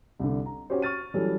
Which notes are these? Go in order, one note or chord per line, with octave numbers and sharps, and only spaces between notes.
C2 D3
A#5
C#4 F#4 G4 C5
C#6 F6 A6 D#7
E3 F#3 G3 C#4 A4